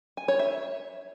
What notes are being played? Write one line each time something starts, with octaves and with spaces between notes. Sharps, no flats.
G#5
C#5
E5